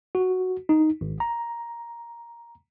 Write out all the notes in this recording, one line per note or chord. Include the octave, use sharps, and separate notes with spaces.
F#4
D#4
G#1
A#5